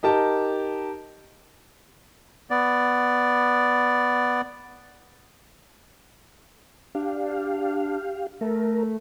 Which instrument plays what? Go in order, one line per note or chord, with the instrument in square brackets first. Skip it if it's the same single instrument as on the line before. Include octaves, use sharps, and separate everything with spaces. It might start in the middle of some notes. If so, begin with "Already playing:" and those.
[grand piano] D#4 G4 A#4 A5
[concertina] B3 D5
[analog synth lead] D4 [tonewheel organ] G4 F5
[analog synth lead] A3 [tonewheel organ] A#4